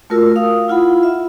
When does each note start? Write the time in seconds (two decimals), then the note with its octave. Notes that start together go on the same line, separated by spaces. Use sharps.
0.10 A3 F4 F#4 A#4 E6
0.36 F5 D#6
0.68 E4 F4 F#5 B5
1.03 E5